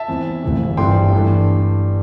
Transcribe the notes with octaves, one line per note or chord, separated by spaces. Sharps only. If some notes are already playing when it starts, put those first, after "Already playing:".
Already playing: E5 A5
E2 E3 C4
E1 D2 C3 E3
G1 G2 E3 G3 C4 G5 C6
G2 E3 A3 D4